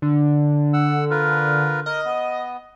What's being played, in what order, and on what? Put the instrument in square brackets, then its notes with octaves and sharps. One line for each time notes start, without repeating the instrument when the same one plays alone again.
[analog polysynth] D3
[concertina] F#5 E6
F4 A#4 B4
[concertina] A#4 [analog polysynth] D#5
[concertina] B3